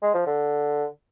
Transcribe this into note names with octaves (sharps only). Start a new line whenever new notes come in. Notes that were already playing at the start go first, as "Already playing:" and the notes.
G#3
F3
D3